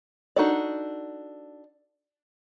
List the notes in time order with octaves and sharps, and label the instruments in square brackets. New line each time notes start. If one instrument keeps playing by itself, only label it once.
[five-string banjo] D4 D#4 F#4 A4 D5